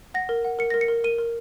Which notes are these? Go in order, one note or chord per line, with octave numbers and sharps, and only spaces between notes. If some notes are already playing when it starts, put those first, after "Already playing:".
F#5 A#6
A#4
F#5
A#4 C#7
A#4 A#6
C#7
A#4
A#4 D#7
A#4